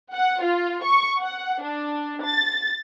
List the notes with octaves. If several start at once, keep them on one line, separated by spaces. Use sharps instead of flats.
F#5
F4
C#6
F#5
D4
A6